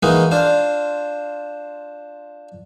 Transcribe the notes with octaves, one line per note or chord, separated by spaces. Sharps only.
E3 G#3 A#3 D#4 F#4
D4 F4 C5